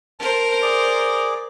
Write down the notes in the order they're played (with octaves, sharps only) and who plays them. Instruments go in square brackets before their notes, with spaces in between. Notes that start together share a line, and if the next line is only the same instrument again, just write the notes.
[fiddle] A#4 C5 [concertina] A5
[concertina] G#4 D5 D6